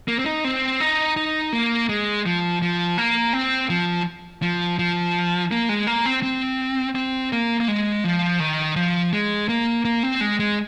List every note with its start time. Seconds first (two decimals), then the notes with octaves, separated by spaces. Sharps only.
0.08 A#3
0.19 C4
0.26 D#4
0.44 C4
0.80 D#4
1.17 D#4
1.53 A#3
1.89 G#3
2.26 F3
2.62 F3
2.98 A#3
3.33 C4
3.70 F3
4.42 F3
4.79 F3
5.51 A#3
5.69 G#3
5.87 A#3
6.05 C4
6.23 C4
6.95 C4
7.32 A#3
7.60 A#3
7.68 G#3
8.04 F3
8.40 D#3
8.76 F3
9.13 G#3
9.49 A#3
9.85 A#3
10.03 C4
10.21 G#3
10.39 G#3